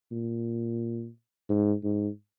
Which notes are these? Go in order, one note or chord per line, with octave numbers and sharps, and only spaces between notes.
A#2
G#2
G#2